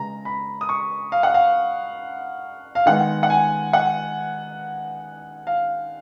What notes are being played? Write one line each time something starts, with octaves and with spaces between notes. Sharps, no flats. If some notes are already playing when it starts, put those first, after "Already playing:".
Already playing: C#3 G#3 B3 A#5
B5
D#6
C#6
F5
F#5
F5
F5
D#3 G#3 B3 F#5
F#5
G#5
F#5
F5